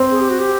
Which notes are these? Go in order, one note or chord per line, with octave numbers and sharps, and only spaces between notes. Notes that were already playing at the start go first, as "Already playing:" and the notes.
Already playing: C4
G#4
G4
F#4
G4